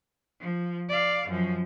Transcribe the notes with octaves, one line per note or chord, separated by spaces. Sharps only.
F3
D5 F5
F#2 F3